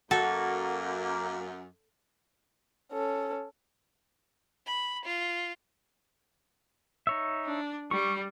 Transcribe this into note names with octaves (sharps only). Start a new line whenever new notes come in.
F#2 A#3 F#4 A4
C#4 A4
B5
F4
D#4 C#5 E5
D4
G3 C#6